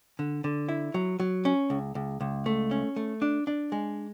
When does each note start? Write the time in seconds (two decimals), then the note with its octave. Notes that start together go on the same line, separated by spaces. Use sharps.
0.19 D3
0.44 D3
0.69 E4
0.94 F#3
1.20 F#3
1.45 C#4
1.70 C#2
1.95 C#2
2.21 C#2
2.46 A3
2.71 C#4
2.96 A3
3.22 D4
3.47 D4
3.72 G#3